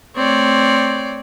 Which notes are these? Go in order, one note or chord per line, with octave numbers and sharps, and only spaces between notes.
A3 C4 C#5 D5